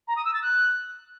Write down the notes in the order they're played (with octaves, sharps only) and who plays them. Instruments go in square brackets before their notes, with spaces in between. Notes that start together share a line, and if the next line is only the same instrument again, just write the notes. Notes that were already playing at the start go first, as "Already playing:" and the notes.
[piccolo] A#5
D#6
E6
A6
F#6